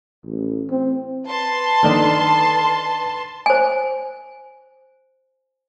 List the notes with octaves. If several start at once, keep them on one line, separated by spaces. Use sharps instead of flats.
A1
C4
B4 A5 C6
D3 D#3 D4
C5 G#5